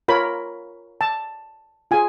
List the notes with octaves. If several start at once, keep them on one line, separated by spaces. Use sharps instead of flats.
F4 A#4 C#5 B5
A5
F4 G#4 G#5